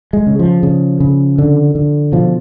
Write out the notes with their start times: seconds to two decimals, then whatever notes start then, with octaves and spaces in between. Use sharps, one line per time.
0.13 G#3
0.27 C#3
0.39 F3
0.63 C#3
1.00 C#3
1.38 D3
1.75 D3
2.12 B2 F3